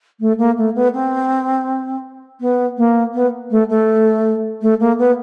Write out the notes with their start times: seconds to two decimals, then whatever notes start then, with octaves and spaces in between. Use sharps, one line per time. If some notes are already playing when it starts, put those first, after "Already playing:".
0.20 A3
0.38 A#3
0.57 A3
0.75 B3
0.93 C4
2.40 B3
2.77 A#3
3.13 B3
3.50 A3
3.69 A3
4.61 A3
4.80 A#3
4.98 B3